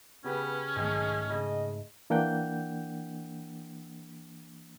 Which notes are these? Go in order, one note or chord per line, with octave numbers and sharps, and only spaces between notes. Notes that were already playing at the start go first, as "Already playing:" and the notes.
C#3 B3 C#4 G4 B4
B1 G#2 D#3 A3 G#4
C#3 D#5
E3 A#3 D4 F#5 G5 G6